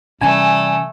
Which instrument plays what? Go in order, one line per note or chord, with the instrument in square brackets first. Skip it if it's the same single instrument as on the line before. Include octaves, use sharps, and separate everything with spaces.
[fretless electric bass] C3 E3 C#4 [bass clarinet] G3 [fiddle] A3 [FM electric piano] G#5